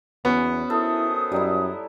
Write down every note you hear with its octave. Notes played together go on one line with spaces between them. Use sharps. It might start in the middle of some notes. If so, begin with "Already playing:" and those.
E2 B3 C#4 F#4
D#3 E4 A4 C5 D#6
F#2 G3 D#4 E4